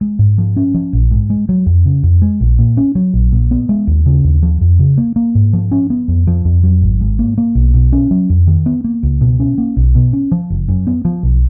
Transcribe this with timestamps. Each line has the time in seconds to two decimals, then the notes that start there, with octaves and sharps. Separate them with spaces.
0.01 G#3
0.19 G#2
0.38 F3
0.56 C#4
0.74 F3
0.93 A#1
1.11 G#2
1.30 G#3
1.49 F#3
1.66 F2
1.86 C#3
2.03 F2
2.22 G#3
2.41 A#1
2.59 A#2
2.77 C#4
2.95 F#3
3.14 A#1
3.32 A#2
3.51 B3
3.69 G#3
3.87 D#2
4.06 C#3
4.24 D#2
4.43 F3
4.61 F2
4.79 C#3
4.98 A#3
5.16 A#3
5.35 G#2
5.53 F3
5.71 C#4
5.90 B3
6.08 F2
6.27 F3
6.45 F2
6.63 F#3
6.82 G#1
7.01 G#2
7.19 A#3
7.38 A#3
7.55 B1
7.74 B2
7.92 C#4
8.11 F#3
8.30 F2
8.47 D#3
8.66 B3
8.84 A#3
9.03 C#2
9.21 B2
9.40 C#4
9.58 A#3
9.77 B1
9.95 B2
10.13 C#4
10.32 F3
10.50 F#1
10.69 F#2
10.87 B3
11.05 F3
11.23 B1